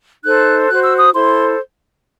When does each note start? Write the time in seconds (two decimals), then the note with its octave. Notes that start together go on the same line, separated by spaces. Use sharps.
0.24 D#4 A4 C5 F#6
0.68 F#4 C5 F#6
0.83 E6
0.99 D#6
1.13 E4 A4 C5 C6